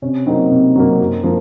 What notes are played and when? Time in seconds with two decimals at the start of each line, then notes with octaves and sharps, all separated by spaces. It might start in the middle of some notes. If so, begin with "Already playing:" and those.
0.02 C3 C#4
0.26 F#3 A#3 C4 D#4
0.51 C3
0.75 F#3 A#3
1.00 F#2
1.24 F3 A#3